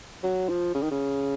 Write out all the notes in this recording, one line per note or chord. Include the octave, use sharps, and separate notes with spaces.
F#3
F3
C#3
D#3
C#3